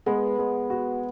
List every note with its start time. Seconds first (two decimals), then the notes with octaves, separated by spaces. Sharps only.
0.06 G#3 B3
0.39 G#3
0.70 F#4